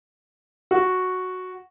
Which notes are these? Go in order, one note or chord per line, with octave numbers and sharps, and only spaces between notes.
F#4